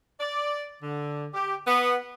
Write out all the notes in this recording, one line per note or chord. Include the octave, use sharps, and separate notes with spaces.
D5
D3
G4
B3